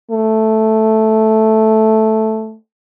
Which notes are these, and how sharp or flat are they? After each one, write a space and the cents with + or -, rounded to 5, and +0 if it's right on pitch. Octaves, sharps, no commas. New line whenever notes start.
A3 -5